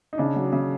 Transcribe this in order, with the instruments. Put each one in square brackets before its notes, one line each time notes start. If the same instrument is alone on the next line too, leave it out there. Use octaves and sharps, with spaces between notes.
[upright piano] D#4
C#3 D4
F#3
C#3